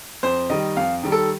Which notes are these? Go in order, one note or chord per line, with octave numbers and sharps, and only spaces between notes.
F2 C5
D#3 G3 D#5
F2 F5
D#3 G3
A4